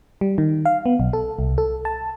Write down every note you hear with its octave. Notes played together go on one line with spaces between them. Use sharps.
G3
D#3
F5
B3
B1
A4
C2
A4
A5